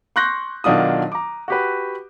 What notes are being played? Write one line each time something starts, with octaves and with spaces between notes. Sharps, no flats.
C6 C#6 F#6 G6 A#6
B1 D#3 F#3 D4 F4 D#6
A#5 D6
F#4 G4 B4